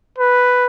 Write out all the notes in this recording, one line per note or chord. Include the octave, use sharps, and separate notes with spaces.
B4